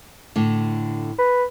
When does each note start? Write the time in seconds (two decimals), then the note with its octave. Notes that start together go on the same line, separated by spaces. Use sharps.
0.36 A2 D3
1.19 B4